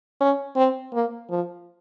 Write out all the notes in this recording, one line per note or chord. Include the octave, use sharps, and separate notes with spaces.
C#4
C4
A#3
F3